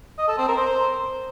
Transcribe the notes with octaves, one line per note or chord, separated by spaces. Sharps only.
D#5
A4
C4
A#4
C5